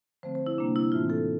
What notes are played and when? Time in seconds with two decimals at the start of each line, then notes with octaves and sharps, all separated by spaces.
0.23 D3 F3 A3 C4 C5
0.35 C5
0.47 E4
0.57 C3 G3 A#3 D4
0.76 E4
0.92 A2 E3 A3 C4 F4
1.10 A4